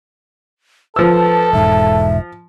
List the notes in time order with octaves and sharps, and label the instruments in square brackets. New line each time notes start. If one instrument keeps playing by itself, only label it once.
[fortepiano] F3 E6 [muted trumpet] A4 [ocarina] B4
[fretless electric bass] E1 G#2 [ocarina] E5